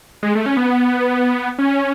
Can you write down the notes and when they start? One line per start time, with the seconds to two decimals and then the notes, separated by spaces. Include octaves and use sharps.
0.23 G#3
0.35 A3
0.46 C#4
0.57 B3
1.59 C#4